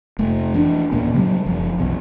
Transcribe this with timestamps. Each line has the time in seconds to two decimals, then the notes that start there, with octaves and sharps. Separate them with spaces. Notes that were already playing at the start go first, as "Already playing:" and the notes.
0.19 F1 A3
0.54 E3 D4
0.92 D#2 A#2 A#3 C#4
1.14 C#3 F#3 G3
1.46 F#1 F3
1.78 B1 E2